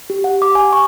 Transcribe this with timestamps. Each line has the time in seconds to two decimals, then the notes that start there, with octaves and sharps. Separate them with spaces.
0.10 G4
0.24 F#5
0.42 D6
0.55 G#5
0.73 C#6